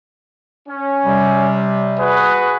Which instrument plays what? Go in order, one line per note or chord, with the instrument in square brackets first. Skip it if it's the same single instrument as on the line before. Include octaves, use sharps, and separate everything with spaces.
[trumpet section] C#4
[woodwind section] C3 G3
[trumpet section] F#4 G#4 B4